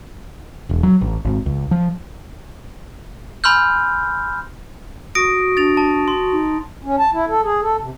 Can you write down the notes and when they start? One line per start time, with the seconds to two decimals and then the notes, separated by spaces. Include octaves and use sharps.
0.69 E1
0.83 F#3
1.01 A1
1.25 G#1
1.46 C#2
1.71 F3
3.44 G#5 B5 C6 E6 F6 G6
5.15 F#4 D#6 A#6 D7
5.57 D4 A6 F7
5.77 A5
6.08 C6
6.32 D#4
6.84 C#4
6.99 A5
7.13 E4
7.28 A4
7.44 G#4
7.62 A4
7.80 C3